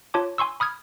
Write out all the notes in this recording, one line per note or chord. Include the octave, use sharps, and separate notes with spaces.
F4 C#5 A5 D6
G#5 C6 C#6 E6
B5 D#6 F6 G#6